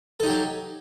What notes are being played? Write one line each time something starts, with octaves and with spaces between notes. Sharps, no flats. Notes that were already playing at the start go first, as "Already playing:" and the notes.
F#3 D#4 G4 A4